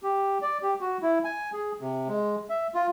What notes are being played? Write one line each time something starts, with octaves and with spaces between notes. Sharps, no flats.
G4
D5
G4
F#4
E4
G#5
G#4
C3
G#3
E5
F4